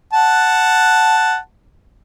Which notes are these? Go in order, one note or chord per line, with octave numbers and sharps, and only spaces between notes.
F#5 A5